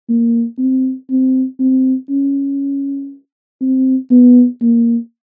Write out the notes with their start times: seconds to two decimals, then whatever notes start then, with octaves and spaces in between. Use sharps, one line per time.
0.09 A#3
0.59 C4
1.10 C4
1.60 C4
2.10 C#4
3.61 C4
4.11 B3
4.62 A#3